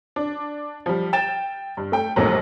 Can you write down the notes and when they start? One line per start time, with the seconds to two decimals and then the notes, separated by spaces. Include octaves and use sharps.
0.16 D4
0.86 F3 G3
1.13 G5 A6 E7
1.77 G2
1.92 A3 G5
2.16 A#1 D#2 G#2 F#3 A3 A#3